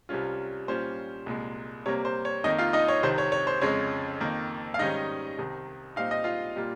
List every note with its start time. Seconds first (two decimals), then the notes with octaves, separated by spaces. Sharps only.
0.09 C2 C3 G3 C#4 F4
0.68 A#2 G3 C#4 F4 C5
1.26 C2 A#2 G#3
1.86 C3 G3 A#3 C#5
2.05 C5
2.25 C#5
2.44 F2 D#3 A#3 D#4 D#5
2.58 F4 F5
2.73 D#4 D#5
2.88 C#5
3.03 C2 C3 D#3 C5
3.18 C#5
3.32 C#5
3.47 C5
3.62 F2 C#3 G#3 C#5
4.20 F2 D#3 A#3
4.74 F5
4.79 G#2 D#3 G3 C#4 D#4 D#5
5.38 C2 C3 D#3
5.96 A#2 G3 C4 D#4 F5
6.11 D#5
6.24 F4 F5
6.56 A#2 G3 A#3 F4